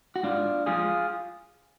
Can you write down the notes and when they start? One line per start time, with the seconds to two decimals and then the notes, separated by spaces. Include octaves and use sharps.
0.16 F#4
0.23 G#2 D4 F4
0.66 F3 G#3 F4 G#4